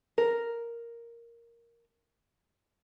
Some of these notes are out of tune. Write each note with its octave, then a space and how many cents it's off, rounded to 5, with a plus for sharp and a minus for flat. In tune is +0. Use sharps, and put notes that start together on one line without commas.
A#4 +0